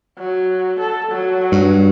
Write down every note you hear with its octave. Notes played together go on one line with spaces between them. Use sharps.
F#3
A4
F#3
G2